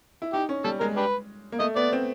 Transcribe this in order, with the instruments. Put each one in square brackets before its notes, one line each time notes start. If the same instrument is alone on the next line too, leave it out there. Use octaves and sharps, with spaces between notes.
[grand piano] E4
[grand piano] D#4 [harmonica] G4
[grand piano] C#4
[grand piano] G3 [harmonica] A4
[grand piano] G#3 [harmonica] A#4
[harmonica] D4 G4 B4
[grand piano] A#3
[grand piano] A3 [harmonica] D#5
[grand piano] B3 [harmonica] D5
[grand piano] C4